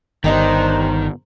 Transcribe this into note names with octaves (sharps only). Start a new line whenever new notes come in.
G1 D#3 D4 D#4 G4 A#4 C5